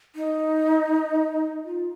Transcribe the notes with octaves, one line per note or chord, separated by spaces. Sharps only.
D#4
F4